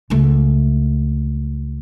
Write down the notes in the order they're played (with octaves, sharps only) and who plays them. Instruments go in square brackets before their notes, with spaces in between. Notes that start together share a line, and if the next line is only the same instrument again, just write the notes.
[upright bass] C#2 A3